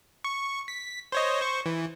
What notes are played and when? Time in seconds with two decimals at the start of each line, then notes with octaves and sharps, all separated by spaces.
0.24 C#6
0.68 B6
1.12 C5 C#5 D#5
1.41 C5 C#6
1.66 E3